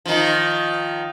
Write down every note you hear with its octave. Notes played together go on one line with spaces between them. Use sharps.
D#3 F3